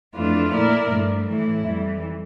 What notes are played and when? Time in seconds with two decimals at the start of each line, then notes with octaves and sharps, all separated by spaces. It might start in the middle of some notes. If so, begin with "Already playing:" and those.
0.15 F2 E3 A3 D4 F4
0.53 A#2 A3 E4 A#4 D5
0.90 G2 F3 A3
1.28 A2 E3 A3 E4
1.66 F2 E3 G3